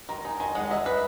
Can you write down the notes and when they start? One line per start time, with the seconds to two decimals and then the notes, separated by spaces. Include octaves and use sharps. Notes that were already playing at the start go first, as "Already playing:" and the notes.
0.09 D#3 A#5
0.25 D#4 G#5
0.40 D#3 G#5
0.55 G#3 F#5
0.71 D#5 E5
0.86 B4